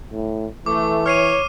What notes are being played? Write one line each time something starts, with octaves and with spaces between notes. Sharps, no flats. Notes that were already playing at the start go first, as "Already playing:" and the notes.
A2
E3 A3 D6
C#5 F6 C7 D#7